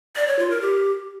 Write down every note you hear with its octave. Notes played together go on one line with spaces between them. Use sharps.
D5
C#5
F4
A#4
G4